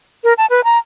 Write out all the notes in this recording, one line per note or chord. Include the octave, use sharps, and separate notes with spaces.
A#4
A5
B4
A#5